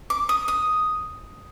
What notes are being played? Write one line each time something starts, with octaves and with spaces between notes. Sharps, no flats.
D6
D#6
D#6